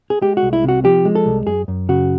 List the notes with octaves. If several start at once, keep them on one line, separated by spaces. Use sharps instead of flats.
G#4
G#3 G4
F#4
C2
E4
C3 F#4
F3 G4
G#3
A4
C2
F#2 G#4
F#2
C#3 F#4